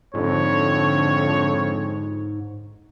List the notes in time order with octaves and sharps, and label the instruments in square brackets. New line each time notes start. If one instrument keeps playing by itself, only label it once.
[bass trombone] F2 [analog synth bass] G#2 [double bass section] D3 [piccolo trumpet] C#5